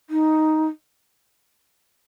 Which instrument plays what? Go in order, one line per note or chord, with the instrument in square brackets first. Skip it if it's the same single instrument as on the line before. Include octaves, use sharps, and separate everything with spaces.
[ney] D#4